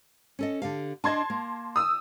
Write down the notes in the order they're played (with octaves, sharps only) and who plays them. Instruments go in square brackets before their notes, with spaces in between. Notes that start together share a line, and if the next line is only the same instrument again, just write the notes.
[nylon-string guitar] C#4 A4 D#5
D3 G4 F5
[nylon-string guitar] D4 D#5 [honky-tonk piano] A5 C6 G#6
[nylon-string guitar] A#3
[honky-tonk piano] D#6 E6